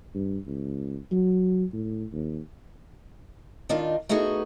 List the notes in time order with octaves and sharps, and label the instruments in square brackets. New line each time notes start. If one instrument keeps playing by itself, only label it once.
[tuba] G2
C#2
F#3
A2
D#2
[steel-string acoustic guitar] D#3 D4 D#4 F4
A3 B3 D#4 F#4 G#4